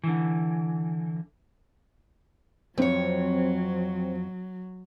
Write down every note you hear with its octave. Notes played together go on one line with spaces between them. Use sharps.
D3 E3
F2 F#3 C4 C#5